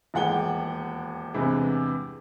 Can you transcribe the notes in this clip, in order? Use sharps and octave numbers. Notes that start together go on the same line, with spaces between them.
D#1 E2 G#3 F#5 G5 G7
E2 G2 C3 E3 G#3